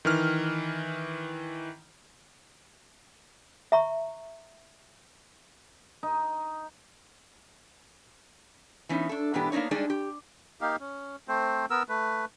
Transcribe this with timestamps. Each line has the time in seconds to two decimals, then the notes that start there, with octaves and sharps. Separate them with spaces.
0.05 D#3 E3 F6
3.72 E5 A#5 C#6
6.03 D#4
8.89 E3 B3 C#4 D#4
9.09 D4 A4
9.34 G#2 B2 E3 B3 D4 G4
9.52 A#3 B3 D4 D#4 C#5
9.71 G3 G#3 D4 D#4 G#4 D5
9.90 G4
10.61 A#3 D#4 G4 F5
10.80 C#4
11.28 A3 C4 C5
11.70 B3 A#4 E6
11.89 A3 B4